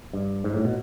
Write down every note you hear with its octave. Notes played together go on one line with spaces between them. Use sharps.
G2
G#2
A2
B2